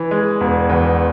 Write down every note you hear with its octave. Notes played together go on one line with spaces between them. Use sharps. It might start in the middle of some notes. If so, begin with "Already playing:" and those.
Already playing: E3
G#3
E1
E2